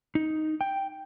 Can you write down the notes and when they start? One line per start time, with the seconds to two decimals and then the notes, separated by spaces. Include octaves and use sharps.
0.15 D#4
0.61 G5